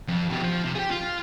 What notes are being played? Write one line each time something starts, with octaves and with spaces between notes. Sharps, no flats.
F2
B2 G4
F3
C3
G4 G#4
F4